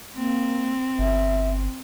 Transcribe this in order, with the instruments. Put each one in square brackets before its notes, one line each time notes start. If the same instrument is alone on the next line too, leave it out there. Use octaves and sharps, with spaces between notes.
[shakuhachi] A#3 [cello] C4
[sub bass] G1 [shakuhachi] E5